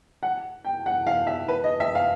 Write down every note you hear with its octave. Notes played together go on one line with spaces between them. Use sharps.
F#5
G5
F#5
F5
E5
B4
D#5
E5
F5